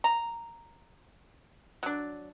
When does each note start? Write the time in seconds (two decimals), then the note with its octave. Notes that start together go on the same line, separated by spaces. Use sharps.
0.04 A#5
1.83 F#3 D4